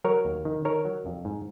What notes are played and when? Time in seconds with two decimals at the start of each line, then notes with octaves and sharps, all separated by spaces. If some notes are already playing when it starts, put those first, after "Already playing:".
0.04 F#3 A#4 C#5
0.25 D#2
0.45 D#3
0.65 D#3 A#4 C#5
0.85 F#3
1.06 F2
1.25 G#2